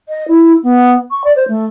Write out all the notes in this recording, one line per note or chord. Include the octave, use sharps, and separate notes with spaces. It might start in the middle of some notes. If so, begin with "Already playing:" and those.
D#5
E4
B3
C#6
D5
C5
A3